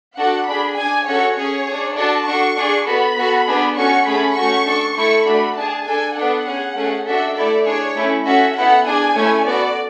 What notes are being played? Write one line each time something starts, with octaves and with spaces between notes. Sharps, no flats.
D4 F#4 A4 F#5
D4 G#4 B5
D4 G#4 G#5
C#4 F#4 A4 C#5
C#4 G#4 C#5
D4 G#4
D4 F#4 A4 A5
D4 F#4 A4 C#6
D4 G#4
B3 F#4 A4 B5
B3 F#4 A4
B3 D4 G#4
C#4 F#4 A4 C#6
A3 C#4 G#4 B5
A3 C#4 F#4 C#6
D4 A4
A3 E4 A4 C#6
A3 D4 F#4 A4 B5
D4 G#4 A5
D4 A4 G#5
B3 D4 A4 F#5
C#4 G#4
A3 C#4 G#4
D4 F#4 A4 E5
A3 E4 A4 D5
D4 G#4 C#5
A3 C#4 E4
C#4 F#4 A4 E5
B3 E4 A4 F#5
D4 G#4 G#5
A3 C#4 E4 A4
B3 F#4 A4 D5